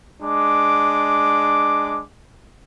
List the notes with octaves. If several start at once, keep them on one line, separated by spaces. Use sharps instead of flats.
G#3 D4 D6